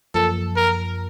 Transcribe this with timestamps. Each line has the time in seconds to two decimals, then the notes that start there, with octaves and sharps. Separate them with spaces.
0.15 F#2 F3 A#3 A4
0.57 A#4